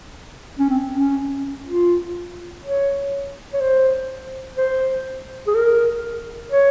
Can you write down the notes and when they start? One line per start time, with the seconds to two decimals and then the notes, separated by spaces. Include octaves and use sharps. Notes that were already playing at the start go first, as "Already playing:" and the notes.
0.59 C#4
0.70 C4
0.94 C#4
1.66 F4
2.63 C#5
3.54 C#5
3.61 C5
4.57 C5
5.47 G#4
5.55 A#4
6.52 C#5